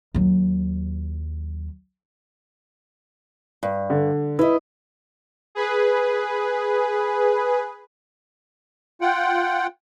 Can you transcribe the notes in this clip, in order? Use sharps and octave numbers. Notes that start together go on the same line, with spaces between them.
D#2 F#3
G2
D3
E4 B4 D#5
G#4 B4
F4 F#5 G5